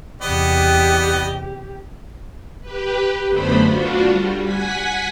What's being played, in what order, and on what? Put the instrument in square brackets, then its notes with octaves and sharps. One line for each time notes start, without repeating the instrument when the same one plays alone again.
[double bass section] E2 C3 [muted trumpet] B3 [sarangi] G4 [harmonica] D5 D#5
[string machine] G4 B4
F#2 D3 A3 B3 C5 B5
D4 F4 F#4
G3
F#5 G#5 B6